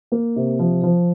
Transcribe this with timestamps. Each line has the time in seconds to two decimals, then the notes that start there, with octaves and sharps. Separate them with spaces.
0.12 A#3
0.36 C3
0.59 F3
0.83 F3